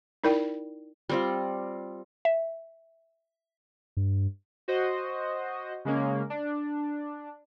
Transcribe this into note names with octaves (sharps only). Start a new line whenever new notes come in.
D#4 E4 A#4 D5 G5
G3 C4 F4
E5
G2
F#4 C5 D#5
C#3 G#3 A#3 C#4
D4